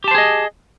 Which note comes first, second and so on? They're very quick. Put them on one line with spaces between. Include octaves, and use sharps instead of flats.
G4 A5 C5 G#4 D#5